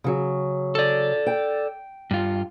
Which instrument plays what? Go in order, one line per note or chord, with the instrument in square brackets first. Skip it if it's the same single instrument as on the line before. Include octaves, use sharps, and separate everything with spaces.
[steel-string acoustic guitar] C#3 F#3
[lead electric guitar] A4 D5
[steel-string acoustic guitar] G5
[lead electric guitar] G2 F4